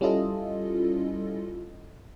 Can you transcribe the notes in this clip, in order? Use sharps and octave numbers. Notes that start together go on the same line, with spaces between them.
G3 C#4 E4 F4 A4 D#5